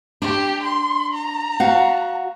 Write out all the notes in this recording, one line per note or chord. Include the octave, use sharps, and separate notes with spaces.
D4 G4
C6
A#5
F#4 F5 F#5